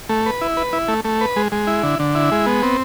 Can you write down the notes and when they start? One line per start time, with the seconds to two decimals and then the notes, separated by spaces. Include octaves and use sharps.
0.09 A3
0.26 B4
0.41 E4
0.57 B4
0.73 E4
0.88 A3
1.05 A3
1.21 B4
1.36 G#3
1.52 G#3
1.67 E4
1.83 D3
1.99 D3
2.15 E4
2.32 G#3
2.46 B3
2.63 C4